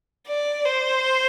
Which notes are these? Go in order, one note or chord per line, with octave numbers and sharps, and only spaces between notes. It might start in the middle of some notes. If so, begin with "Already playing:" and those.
D5
C5